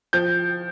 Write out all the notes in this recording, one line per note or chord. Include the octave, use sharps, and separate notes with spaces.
F3 G6